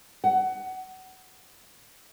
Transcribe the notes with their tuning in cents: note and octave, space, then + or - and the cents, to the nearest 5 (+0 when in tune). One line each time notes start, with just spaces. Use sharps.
F#5 +20